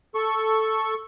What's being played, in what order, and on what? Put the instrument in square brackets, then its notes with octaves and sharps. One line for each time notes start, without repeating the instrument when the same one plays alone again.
[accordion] A4 C#6